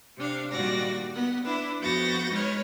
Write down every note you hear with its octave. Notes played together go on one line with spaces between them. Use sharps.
C3 D4 F5
A#2 D#3 G3 F#4 D5 A#6
B3 F#5
D4 E4 B4
F2 B3 F#4 G6 A6 A#6
G#3 D#4 B4 C#5 F6